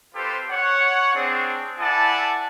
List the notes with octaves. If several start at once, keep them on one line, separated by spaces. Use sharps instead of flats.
C4 F4 G4 A4 B4 C5
C#5 F#5
C4 D4 G#4
E4 A4 D5 F#5 G#5 A5